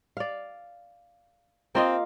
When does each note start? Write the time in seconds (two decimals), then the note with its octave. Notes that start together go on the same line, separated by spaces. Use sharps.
0.17 D5 F5
1.75 A#3 C4 F4 D#5